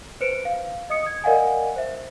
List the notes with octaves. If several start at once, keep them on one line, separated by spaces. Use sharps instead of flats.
B4 C5 C#7 D7
F5
D#5 D#6 C#7
D#6 G#6
A#4 D5 D#5 F5 F#5 G#5
C5 E5